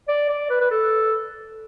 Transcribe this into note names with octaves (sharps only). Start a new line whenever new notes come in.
D5
D5
B4
B4
A4